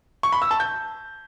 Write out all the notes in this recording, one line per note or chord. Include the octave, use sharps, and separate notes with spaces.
C#6
B5
E6
A5
G6